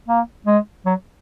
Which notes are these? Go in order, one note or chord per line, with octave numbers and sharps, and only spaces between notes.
A#3
G#3
F#3